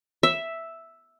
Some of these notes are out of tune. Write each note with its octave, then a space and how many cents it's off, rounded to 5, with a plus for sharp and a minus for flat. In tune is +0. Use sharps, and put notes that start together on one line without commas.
E5 +0